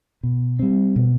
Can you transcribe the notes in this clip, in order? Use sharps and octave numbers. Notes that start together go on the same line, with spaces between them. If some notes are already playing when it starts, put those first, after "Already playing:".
B2
G3 C4
B2